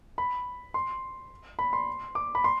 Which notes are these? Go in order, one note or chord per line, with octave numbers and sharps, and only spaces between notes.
B5
C6
B5
C6
D6
B5
C6